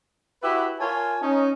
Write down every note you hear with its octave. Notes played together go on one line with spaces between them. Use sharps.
E4 F#4 G4 B4 E5
F4 A#4 C#5 G#5 A5
C#4 D#4